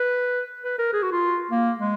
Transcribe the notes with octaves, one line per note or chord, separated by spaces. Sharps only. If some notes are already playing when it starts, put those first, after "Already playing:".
Already playing: B4
B4
A#4
G#4
F#4
F4
A#3
G#3